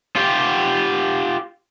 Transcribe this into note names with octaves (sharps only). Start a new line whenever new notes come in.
F4 G4